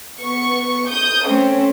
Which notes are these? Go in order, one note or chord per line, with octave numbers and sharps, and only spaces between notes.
B3 C#6
D#6 G6
A3 C4 C#4